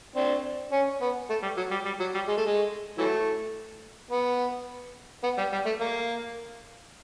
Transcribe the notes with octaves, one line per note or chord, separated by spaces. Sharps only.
C4 D4
C#4
B3
A3
G3
F#3
G3
G3
F#3
G3
G#3
A3
G#3
E3 F#3 A3
B3
B3
G3
G3
A3
A#3